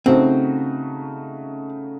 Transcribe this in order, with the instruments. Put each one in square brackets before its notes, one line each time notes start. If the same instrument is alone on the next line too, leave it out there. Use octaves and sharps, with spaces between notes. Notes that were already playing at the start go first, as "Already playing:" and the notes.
[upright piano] C#3 A3 D#4 F#4 [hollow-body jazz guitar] C4